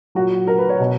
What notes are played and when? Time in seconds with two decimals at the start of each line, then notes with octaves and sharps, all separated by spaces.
0.15 A#2 F#3 F#4
0.47 A#4
0.58 B4
0.69 C#5
0.80 B2